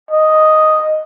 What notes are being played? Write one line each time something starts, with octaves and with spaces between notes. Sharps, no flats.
D#5